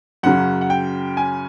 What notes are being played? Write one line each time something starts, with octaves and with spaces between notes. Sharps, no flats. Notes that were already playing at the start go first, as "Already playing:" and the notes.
F#2 C#3 F#3 F#5
F#5
G5
G#5